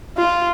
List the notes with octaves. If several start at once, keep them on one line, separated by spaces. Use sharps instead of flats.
F4